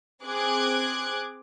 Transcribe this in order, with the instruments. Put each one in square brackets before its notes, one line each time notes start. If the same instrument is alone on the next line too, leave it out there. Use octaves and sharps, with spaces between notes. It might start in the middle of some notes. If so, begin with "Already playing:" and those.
[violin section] C4 G#4 D6 F#6 G#6